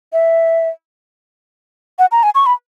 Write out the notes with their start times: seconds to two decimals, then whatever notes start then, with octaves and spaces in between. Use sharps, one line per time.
0.13 E5
1.99 F#5
2.12 A#5
2.23 G#5
2.35 C#6
2.46 B5